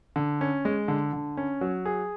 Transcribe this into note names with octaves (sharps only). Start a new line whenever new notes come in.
D3
C#4
G#3
D3
D3
C#4
F#3
G#4